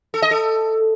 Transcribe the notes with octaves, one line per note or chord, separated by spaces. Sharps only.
A4
D#5
A4